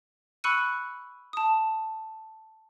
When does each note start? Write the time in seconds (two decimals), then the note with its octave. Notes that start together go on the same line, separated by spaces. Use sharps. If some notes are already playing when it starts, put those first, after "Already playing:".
0.44 B5 C#6 E6 F#6 C#7 D#7
1.33 A5 D#6